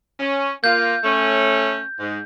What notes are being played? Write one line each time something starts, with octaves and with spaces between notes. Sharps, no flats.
C#4
A#3 F4 G6
A3 C#4
G#2